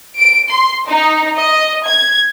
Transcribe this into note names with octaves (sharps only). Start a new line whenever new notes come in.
D7
C6
D#4
D#5
G#6